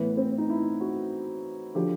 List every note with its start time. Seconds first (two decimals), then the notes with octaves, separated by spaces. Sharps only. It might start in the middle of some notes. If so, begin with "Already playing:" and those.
Already playing: A2 E3 B3
0.17 C4
0.38 D#4
0.49 E4
0.81 F#4
1.75 D3 F3 G4